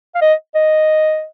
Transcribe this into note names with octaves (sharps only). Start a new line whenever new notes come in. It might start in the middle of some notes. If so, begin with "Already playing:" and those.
F5
D#5
D#5